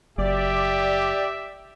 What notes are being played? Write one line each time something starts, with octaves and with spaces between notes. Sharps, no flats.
F#1 F#2 G4 D5 E5